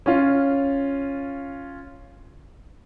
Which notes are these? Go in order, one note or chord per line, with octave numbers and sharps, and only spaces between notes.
C#4 F4